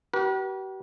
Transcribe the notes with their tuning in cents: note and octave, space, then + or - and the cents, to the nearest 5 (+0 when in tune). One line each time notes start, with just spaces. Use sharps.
G4 -45 B4 -40